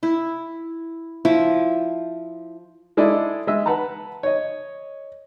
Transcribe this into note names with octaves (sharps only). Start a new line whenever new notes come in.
E4
F3 E4
G#3 E4 A4 D5 D#5
G#3 D#5 E5
B4 F#5 A5 A#5
C#5 D#5